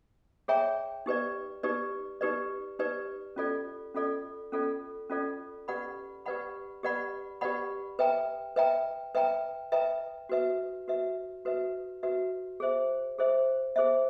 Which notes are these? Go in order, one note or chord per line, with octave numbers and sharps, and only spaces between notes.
G#4 C#5 E5 G5 A#5
D#4 G4 B4 D5
D#4 G4 B4 D5
D#4 G4 B4 D5
D#4 G4 B4 D5
C#4 F4 A4 D5
C#4 F4 A4 D5
C#4 F4 A4 D5
C#4 F4 A4 D5
G4 B4 D5 F#5 B5
G4 B4 D5 F#5 B5
G4 B4 D5 F#5 B5
G4 B4 D5 F#5 B5
B4 E5 G5 A#5
B4 E5 G5 A#5
B4 E5 G5 A#5
B4 E5 G5 A#5
F#4 B4 E5
F#4 B4 E5
F#4 B4 E5
F#4 B4 E5
G#4 C5 E5
G#4 C5 E5
G#4 C5 E5